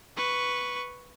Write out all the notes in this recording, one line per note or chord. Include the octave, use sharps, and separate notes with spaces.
B4 C#6